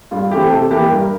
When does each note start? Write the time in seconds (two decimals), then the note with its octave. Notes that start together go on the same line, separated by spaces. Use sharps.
0.11 G2 F4
0.31 E3 A3 C4 G4
0.50 C3 A4
0.71 E3 A#3 G4
0.90 G2 A#4